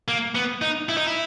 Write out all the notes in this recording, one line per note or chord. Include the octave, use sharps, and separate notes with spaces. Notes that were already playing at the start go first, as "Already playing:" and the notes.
A#3
B3
D#4
E4
D#4
E4